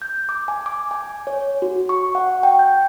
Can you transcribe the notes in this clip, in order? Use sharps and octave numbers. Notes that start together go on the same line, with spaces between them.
G6
D6
G#5
D6
G#5
C#5
F#4
C#6
F#5
G5
G6